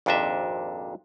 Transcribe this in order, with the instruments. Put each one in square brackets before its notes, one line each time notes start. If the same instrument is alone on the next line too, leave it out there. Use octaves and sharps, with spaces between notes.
[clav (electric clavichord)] G#1 F2 A#2 D4 D#5 E5